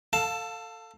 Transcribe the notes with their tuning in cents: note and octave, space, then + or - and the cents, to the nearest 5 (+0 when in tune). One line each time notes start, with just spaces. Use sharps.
A4 +20 F5 +15 A5 +0